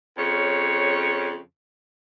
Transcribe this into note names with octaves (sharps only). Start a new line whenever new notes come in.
F2 C#3 C#5